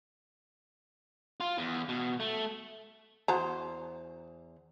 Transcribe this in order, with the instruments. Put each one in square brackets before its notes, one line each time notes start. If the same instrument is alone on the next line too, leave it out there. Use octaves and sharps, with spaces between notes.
[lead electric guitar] F4
E2
B2
A3
[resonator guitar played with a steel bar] E2 C5 [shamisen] F#4 A5 A#5